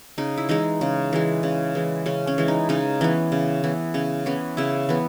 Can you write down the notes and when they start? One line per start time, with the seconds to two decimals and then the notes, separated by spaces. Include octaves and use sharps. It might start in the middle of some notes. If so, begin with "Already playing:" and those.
0.18 C#3 D#4
0.38 E4
0.49 E3 G#3 D#4
0.81 C#3
1.13 E3 G#3
1.43 C#3
1.75 E3 G#3
2.06 C#3 C#4
2.27 C#4
2.38 E3 G#3
2.48 D#4
2.69 C#3 D#4
3.01 E3 B3 C#4
3.32 C#3
3.64 E3 B3
3.94 C#3 C#4
4.26 E3 B3 C#4
4.57 C#3 E4
4.89 E3 B3